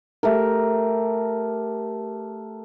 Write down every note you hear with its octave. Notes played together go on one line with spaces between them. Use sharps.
A3 G4 A#4